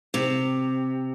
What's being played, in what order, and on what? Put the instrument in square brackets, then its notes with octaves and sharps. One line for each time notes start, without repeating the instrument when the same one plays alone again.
[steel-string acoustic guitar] C3